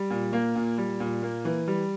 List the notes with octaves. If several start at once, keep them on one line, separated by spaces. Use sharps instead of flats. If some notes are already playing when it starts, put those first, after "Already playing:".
Already playing: G3
A#2
A#3
A#2
G3
A#2
A#3
E3
G3